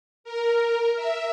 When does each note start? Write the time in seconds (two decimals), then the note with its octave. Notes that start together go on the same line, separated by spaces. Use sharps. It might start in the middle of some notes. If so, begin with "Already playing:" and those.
0.24 A#4
0.96 E5